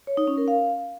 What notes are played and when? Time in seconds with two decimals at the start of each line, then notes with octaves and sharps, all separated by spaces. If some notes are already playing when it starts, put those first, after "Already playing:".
0.07 C#5
0.17 D#4
0.27 C#4
0.38 A#4
0.48 F5